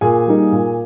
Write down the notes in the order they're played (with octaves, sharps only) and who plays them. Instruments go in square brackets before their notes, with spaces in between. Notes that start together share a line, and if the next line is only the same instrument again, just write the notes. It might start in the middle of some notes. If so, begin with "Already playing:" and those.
[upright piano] A#2 G#4 G#5
G3 A#3 D#4
A#2